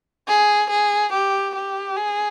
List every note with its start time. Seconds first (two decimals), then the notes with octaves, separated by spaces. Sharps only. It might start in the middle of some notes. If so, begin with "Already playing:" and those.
0.28 G#4
0.70 G#4
1.13 G4
1.55 G4
1.97 G#4